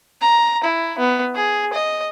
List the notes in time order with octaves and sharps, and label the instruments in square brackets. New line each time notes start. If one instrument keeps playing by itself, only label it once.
[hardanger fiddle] A#5
E4
B3
G#4
D#5